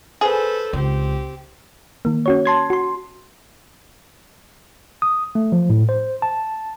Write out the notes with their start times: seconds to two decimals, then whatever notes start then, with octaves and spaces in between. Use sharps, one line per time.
0.21 G#4 A4 B4 C5
0.73 C#2 C4 G4
2.05 D#3 A#3
2.26 C#4 F#4 C#5
2.45 A5 C6 G#6
2.70 F#4 C6
5.02 D#6
5.35 A3
5.52 F3
5.70 A2
5.89 C5
6.22 A5